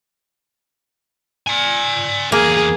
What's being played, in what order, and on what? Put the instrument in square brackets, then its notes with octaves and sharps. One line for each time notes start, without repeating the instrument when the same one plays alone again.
[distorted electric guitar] D5 G#5
[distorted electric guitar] E2 A#4 [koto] A#3 [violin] G#4